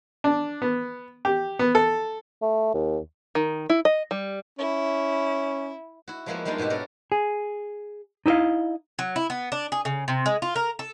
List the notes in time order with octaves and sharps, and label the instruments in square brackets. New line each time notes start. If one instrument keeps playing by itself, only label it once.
[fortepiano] D4
B3
G4
B3
A4
[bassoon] A3
D#2
[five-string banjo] D#3
E4
D#5
G3
[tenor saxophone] C#4 [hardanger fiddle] E4
[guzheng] E4 F#4
F3 G#3 A#3 B3 E4 F#4
G3 G#3 A#3 D4 D#4 F4
G#2 B2 F#4 G4 E5
B3 C#4 D4 A4 A#4
[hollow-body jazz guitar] G#4
D#4 E4 B4 D#5 F5
[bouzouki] F#3
E4
B3
D4
G#4
C#3
C3
G#3
F4
A#4
A4